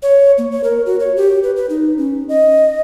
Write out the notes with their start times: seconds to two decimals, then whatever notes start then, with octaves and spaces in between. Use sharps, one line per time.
0.02 C#5
0.38 A#3
0.51 C#5
0.64 A#4
0.86 F#4
1.00 C#5
1.17 G4
1.43 B4
1.56 B4
1.70 D#4
1.98 C#4
2.29 D#5